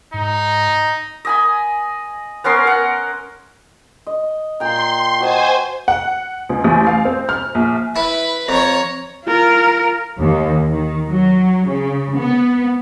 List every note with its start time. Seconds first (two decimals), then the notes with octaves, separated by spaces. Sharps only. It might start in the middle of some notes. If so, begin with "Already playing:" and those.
0.14 G#2 D#4
1.25 D#5 G#5 B5
2.44 B3 C#4 A#4 C6
2.65 A#4 F#5
4.07 D#5
4.60 A#2 G5 A#5 C6
5.20 F#4 C5 D#5 G#5 A5
5.88 F#5
6.49 C#2
6.64 A1
6.87 F5
7.05 C4
7.29 F6
7.55 A#1
7.96 E4 B4
8.49 F2 C#5 A#5
9.25 F4 A#4
10.20 D#2
10.71 D#3
11.09 F#3
11.68 C#3
12.16 B3